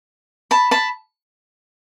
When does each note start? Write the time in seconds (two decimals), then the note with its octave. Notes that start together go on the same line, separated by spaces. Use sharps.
0.51 A5 B5
0.71 A5 B5